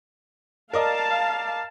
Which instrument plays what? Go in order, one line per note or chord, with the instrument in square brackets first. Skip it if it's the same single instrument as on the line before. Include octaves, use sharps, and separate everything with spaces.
[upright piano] A#4 D5 D#5 [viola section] F5 A5